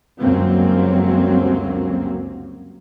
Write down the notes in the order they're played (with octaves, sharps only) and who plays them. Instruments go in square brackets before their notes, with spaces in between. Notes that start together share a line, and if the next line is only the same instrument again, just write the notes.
[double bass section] G1 C#2 F#2 F#3 A#3 C4